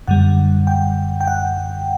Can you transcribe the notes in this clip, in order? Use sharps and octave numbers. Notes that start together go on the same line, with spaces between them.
F#2 D3 G3 F#5
G5
G5
F#5